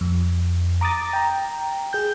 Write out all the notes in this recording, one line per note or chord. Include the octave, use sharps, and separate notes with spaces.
F2
A#5 D6 D#6 A6
G5 A#5
G#4 G6